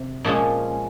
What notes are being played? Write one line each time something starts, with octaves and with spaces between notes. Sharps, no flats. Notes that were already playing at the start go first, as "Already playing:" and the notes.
Already playing: C3
A#2 F3 G#3 C#4